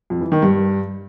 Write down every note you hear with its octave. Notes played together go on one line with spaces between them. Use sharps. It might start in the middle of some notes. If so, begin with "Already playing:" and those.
F2
E3
D#3
G2